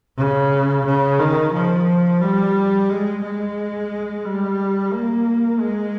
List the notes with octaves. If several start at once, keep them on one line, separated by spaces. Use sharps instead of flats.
C#3
C#3
D#3
F3
G3
G#3
G#3
G3
A#3
G#3